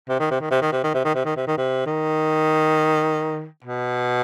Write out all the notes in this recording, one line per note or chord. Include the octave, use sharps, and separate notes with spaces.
C3
D#3
C3
D#3
C3
D#3
C3
D#3
C3
D#3
C3
D#3
C3
D#3
C3
D#3
B2